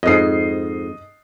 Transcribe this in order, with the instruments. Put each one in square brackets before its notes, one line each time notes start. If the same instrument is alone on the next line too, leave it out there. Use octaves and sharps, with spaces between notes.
[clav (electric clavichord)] F2 G#2 [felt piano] D#5 C7